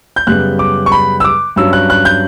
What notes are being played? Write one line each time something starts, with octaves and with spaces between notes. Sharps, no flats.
G6
F#2 C#3 G3 B3 F#6
D6
C#6
B5
E6
D6
G2 F#3 C#4 E6
F#6
F#6
G6